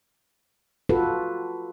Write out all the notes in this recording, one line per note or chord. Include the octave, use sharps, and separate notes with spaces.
F4 F#4 A4 B4